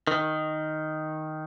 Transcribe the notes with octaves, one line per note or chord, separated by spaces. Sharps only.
D#3